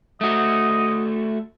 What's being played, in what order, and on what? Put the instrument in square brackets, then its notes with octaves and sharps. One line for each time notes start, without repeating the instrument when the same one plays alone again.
[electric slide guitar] A3 F#4 [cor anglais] D#5